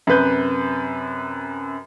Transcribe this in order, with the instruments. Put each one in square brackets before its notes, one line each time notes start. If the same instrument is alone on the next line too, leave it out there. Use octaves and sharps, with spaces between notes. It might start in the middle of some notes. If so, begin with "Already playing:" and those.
[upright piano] F#2 C3 B4 G6